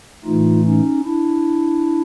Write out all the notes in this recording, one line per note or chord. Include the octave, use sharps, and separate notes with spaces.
A2 E3 A3 D#4 F4
C#4 D#4
D4 E4